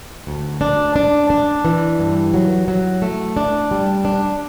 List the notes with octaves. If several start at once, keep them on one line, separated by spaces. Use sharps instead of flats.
D2
D4
D4
D4
E3
G2
F#3
F#3
A3
D4
G3
D4